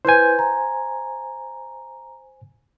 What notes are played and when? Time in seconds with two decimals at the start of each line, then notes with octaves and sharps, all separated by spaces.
0.05 E4 B4 C5 G#5 G6
0.39 A#5